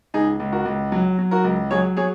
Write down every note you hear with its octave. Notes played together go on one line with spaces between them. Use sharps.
C#2 D#4 G#4
C#2
F#4 A#4
C#2
F#3
F#3
F#4 A#4
C#2
F#3 G#4 C#5
F#3 G#4 C#5